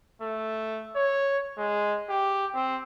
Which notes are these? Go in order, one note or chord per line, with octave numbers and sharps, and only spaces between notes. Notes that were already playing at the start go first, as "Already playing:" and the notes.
A3
C#5
G#3
G4
C4